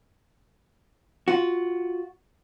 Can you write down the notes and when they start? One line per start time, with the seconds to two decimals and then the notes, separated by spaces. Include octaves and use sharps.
1.28 F4 F#4